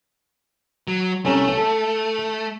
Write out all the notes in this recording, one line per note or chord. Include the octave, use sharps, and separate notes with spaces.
F#3
C2 A3 C#4 A#5
A4